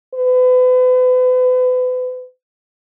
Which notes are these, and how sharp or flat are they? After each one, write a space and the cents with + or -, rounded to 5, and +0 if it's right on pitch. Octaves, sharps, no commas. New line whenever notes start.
B4 +35